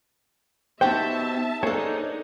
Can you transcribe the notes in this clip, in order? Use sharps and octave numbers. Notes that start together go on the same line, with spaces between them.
B3 D#4 F#4 G4 C5 E5 G5 A5
A#3 D4 D#4 G#4 A4 C5 C#5